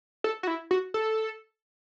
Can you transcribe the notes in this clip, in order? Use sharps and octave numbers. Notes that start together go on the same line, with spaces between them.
A4
F#4
E4
F#4
A4